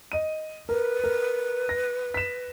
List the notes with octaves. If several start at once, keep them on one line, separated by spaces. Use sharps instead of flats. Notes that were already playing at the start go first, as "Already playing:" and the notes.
D#5 D#7
A#4 B4
A#4
A#6
B6 E7